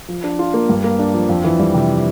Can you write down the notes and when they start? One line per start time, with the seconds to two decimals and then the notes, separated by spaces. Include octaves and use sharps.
0.08 F3
0.24 D4
0.39 F4
0.54 A#3
0.69 G2
0.84 A#3
0.99 D4
1.14 F3
1.29 F2
1.44 E3
1.59 G3
1.74 C3